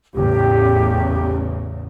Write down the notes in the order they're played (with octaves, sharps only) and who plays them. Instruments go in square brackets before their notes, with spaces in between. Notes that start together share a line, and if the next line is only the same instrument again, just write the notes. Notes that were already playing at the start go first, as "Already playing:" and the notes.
[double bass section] A1 E2 C#3 [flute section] G4